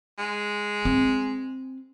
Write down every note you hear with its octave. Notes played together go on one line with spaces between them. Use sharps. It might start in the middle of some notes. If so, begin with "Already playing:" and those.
G#3
C4